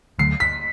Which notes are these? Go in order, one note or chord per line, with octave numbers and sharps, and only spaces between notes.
D2 D3 F#3 A3 C7
B6